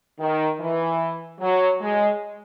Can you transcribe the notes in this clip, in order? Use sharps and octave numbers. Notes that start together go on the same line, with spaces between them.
D#3
E3
F#3
G#3